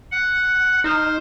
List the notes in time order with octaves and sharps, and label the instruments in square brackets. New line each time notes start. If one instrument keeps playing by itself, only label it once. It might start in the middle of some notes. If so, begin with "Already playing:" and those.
[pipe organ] F#5 [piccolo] C#7
[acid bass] D#4 [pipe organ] C5 [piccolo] F6